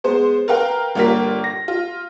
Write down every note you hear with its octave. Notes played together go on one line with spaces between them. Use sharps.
G#3 B3 C5
A#4 B4 F5 G5 A#5
G1 G3 A#3 F4 A#4 B6
A#6
F4